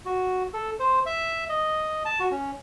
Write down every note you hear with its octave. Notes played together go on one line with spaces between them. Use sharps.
F#4
A4
C5
E5
D#5
A5
F#4
C#4